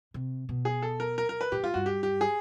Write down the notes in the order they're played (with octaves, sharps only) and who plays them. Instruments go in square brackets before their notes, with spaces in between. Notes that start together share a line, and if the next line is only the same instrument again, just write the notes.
[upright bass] C3
B2
[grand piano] G#4
A4
A#4
A#4
A#4
B4
[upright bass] A2 [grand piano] G4
[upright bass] G#2 [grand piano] F4
[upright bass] G2 [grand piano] F#4
[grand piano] G4
G4
G#4